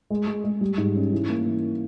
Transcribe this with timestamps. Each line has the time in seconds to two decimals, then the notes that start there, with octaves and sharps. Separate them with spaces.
0.10 G#3
0.27 G#3
0.44 G#3
0.61 G3
0.78 G#2
0.95 C#4
1.12 E3
1.30 A#3
1.46 E3